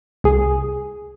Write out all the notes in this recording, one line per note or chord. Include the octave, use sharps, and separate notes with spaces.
C2 G#4